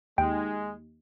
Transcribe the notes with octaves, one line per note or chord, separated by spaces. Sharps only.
D#2 G#3 G5